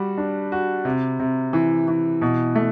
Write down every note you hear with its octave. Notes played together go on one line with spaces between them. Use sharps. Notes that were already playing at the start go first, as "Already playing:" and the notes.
Already playing: G3 F#4
D4
F#4
C3
C3
E3
E3
B2
A3